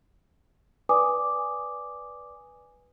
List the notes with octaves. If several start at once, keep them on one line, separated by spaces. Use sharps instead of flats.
B4 D5 G#5 D6 D#6